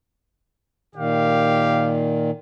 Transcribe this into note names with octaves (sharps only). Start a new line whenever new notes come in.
A#2 D#3 G4 F5